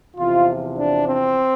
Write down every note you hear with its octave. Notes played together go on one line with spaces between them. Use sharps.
E2 C3 F3 F4
D4
C4